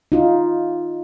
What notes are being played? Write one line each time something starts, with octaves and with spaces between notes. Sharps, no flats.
D#4 F4